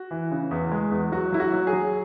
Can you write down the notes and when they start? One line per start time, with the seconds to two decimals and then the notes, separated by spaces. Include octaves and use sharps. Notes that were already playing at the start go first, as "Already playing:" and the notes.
Already playing: F#4
0.11 E3
0.31 C#3
0.51 E2
0.72 G#3
0.91 E2
1.12 F#3 F#4
1.32 F#3 E4
1.40 F#4
1.53 F#3
1.67 G#4
1.73 F#3